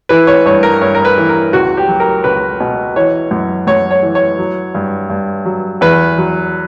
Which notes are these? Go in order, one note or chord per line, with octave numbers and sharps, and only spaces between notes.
E3 B4
C#5
G2 C#5
A#4
G2 C#5
A#4
B4
E3
A#4
C#2 F#4
G4
F#3
A#4
C#2 B4
B2
E3 C#5
F#2
F#2 C#5
C#5
E3
C#5
F#3
G2
G2
F#3
E2 B4
F#3